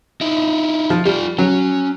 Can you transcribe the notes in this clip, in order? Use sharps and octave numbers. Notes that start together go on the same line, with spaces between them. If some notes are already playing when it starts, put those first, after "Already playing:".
D#4 E4
F3
G3 F4 G4
F#3 C#4